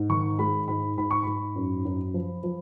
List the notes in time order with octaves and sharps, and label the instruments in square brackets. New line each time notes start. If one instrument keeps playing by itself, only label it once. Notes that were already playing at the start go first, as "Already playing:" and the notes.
Already playing: [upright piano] G#2
D#3 C#6
G#3 B5
G#2 B5
G#2 B5
C#6
G#2 B5
F#2
F#2
F3
F3